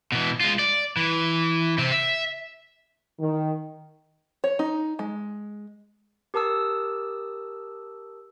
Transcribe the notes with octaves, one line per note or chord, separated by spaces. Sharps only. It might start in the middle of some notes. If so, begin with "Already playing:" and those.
B2 E3
G#3 F4
D5
E3
C3 C4
E5
D#3
C#5
D#4
G#3
G4 A#4 A5 D#6 E6